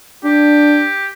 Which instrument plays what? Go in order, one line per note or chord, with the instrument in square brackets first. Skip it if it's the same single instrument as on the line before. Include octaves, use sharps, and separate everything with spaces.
[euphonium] D4 [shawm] G4